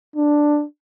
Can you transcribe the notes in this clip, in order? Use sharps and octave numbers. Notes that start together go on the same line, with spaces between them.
D4